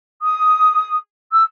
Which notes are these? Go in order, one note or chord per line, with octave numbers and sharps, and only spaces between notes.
D#6
E6